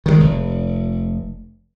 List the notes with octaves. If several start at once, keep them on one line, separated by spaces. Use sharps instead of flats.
D#3 F3 G#3
F1